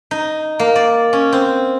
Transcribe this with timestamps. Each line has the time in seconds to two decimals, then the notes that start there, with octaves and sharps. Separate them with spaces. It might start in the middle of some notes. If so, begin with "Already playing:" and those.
0.11 D#4
0.59 A#3
0.76 D5
1.13 C#4
1.33 C4